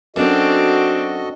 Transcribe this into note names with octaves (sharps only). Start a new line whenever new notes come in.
F#2 C4 D4 F#4 A4 D#5